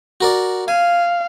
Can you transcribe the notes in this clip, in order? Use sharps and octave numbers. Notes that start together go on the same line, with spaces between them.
F#4 A#4 D5
F5 G#5